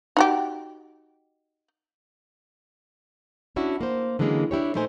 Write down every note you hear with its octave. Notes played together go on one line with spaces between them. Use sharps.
D#4 F#4 G4
C#4 D4 E4 F#4
A#3 C5
D3 E3 F#3 G#3 A#3 C#4
D4 E4 G4 C#5
A#2 A3 D#4 A#4 C5 G#5